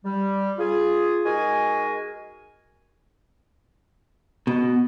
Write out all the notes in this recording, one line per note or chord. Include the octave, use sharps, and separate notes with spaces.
G3
F4 G#4
G#3 D#4 F#4 G#4 A#4 G#5
B2